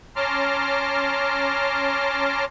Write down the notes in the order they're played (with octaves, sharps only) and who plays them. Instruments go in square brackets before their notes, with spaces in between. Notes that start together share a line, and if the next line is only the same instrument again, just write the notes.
[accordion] C#4 A5 A#5 C6 D6 F6